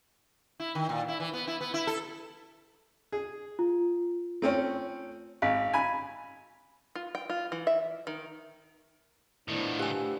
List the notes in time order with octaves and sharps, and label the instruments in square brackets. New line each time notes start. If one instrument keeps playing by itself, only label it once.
[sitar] E4
D#3
A#2
E4
E3
B3
E4
B3
E4
A4
[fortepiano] G#4
[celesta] F4
[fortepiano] A3 C4 C#4
[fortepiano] G#1 [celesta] F5 B6
[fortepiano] G#5 B5
[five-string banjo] F4
G5
F4
E3
E5
D#3
[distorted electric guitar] A2 D#3 [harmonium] F3 B3 D4 [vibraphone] A3 E4
[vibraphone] A3 G5 E6 [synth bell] G4 G#5